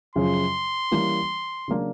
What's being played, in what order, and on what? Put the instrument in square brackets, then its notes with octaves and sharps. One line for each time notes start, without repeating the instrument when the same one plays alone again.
[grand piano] F#2 C#3 F3 [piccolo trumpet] C6
[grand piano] E3 G3 A#3 C#4
C#3 F#3 A#3 D4